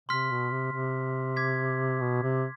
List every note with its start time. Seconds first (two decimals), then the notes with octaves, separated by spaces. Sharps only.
0.09 C3 C6 F6 B6
0.30 B2
0.51 C3
0.72 C3
1.36 D6 G#6 B6
2.01 B2
2.23 C3